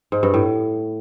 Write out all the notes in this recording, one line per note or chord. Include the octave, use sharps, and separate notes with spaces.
G#2
G2
A2